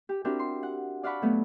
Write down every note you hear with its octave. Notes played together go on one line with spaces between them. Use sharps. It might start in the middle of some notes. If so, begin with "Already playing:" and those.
G4
C4 D4 E4 F#4 G4 A#4
C6
F#5
D5 F5 F#5 A5 B5 C#6
F#3 A3 B3